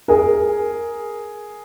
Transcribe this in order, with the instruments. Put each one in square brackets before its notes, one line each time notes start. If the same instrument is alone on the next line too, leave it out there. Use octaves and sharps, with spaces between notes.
[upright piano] G#4 A#4